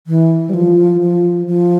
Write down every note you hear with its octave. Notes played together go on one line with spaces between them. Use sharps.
E3
G3
F3
F3
F3